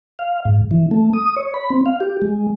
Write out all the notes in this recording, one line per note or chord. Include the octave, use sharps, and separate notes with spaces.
F5
G#2
E3
A3
D#6
C#5
B5
C4
F5
G4
G#3